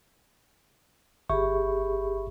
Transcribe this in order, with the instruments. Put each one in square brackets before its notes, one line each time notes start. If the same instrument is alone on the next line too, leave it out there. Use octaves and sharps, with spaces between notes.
[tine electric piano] G1 E5 C#6 [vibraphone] G4 G#4 B5